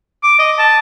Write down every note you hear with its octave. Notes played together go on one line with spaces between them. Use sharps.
D6
D#5
A5